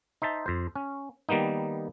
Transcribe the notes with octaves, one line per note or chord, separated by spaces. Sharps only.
D#4 C5 E5 A5
F2 C5
C#4
D#3 G3 A#3 B3 D#4